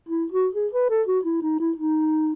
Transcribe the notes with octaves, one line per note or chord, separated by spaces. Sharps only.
E4
F#4
G#4
B4
A4
F#4
E4
D#4
E4
D#4